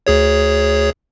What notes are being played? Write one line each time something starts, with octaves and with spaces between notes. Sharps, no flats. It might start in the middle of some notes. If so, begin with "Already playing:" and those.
D2 G#4 C#5